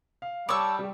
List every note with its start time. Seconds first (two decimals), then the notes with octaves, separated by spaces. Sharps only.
0.22 F5
0.49 G3 C#5 A5 C#6 D6 E6
0.79 G3 G4